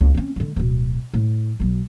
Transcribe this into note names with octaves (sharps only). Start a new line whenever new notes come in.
C#2
C4 C#4
D3 G#3
D1 B2
A2
B1 F#3